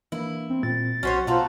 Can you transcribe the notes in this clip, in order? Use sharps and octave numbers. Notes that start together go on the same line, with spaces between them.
E3 A#3 D4 E4
C4
A#2 C4 A6
B1 C#4 F#4 C5 C#5 F#5
B2 A3 F4 F#4 C5 A#5